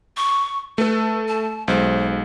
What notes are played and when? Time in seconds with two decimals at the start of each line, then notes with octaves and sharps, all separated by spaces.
0.17 C#6
0.78 A3 A4 B4
1.28 A5
1.68 B1 G#3 C5